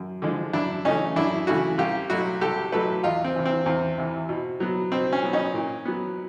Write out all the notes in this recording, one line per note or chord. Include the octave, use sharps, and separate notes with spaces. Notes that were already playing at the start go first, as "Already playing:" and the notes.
Already playing: F#2
D3 F3 G#3
F#2 D4 E4
C#3 E3 A3 C#4 D#4
F#2 D4 E4
C#3 E3 A3 E4 F#4
C2 F4 G4
B2 F#3 A3 E4 F#4
C2 G4 A4
B2 F#3 A3 A4 B4
E2 D#4 F4
C4
C3 E3
C4
E2 C4
C3 E3
B2
F#3 B3
B2 C4
C#4
F#3 B3
C#4 D#4
A#2
F#3 B3